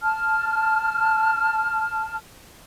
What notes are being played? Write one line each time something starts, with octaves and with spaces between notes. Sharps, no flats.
A5 F6